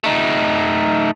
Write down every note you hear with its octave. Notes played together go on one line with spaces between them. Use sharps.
A3 D#4